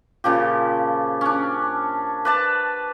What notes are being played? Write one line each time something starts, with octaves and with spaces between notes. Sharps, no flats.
A#2 C#3 F3 G4
C#4 D4
B4 D5 A5